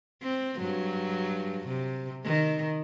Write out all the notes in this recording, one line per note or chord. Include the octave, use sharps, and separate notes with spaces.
C4
G2 F#3
C3
D#3